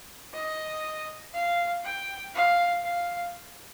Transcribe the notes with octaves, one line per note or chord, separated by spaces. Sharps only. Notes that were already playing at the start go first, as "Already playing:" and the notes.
D#5
F5
G5
F5
F5